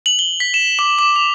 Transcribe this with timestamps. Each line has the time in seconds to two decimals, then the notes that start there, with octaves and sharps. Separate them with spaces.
0.06 F#7
0.19 G7
0.40 B6
0.54 E7
0.79 D6
0.99 D6
1.16 F7